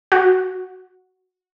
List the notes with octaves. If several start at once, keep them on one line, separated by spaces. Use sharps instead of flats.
F#4